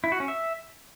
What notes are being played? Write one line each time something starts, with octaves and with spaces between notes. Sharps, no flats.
E4
F#4
C#4
E5